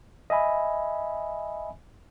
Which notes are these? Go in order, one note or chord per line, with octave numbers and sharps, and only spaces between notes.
D#5 E5 G#5 B5